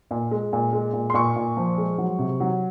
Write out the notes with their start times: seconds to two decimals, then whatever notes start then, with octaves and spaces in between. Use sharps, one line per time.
0.11 A#2
0.31 G#3
0.53 A#2
0.73 G#3
0.93 A#2
1.10 C6
1.14 A#2 C#6
1.36 A#2
1.57 F3
1.78 G#3
1.98 F#3
2.19 C3
2.40 F#3